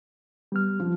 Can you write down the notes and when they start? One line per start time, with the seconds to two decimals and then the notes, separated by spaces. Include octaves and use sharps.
0.52 G3 B3 F6
0.80 F3